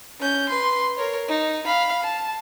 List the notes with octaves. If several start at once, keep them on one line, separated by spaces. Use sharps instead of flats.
C#4 G6
B4 C6
A#4 C#5
D#4
F5 B5
A5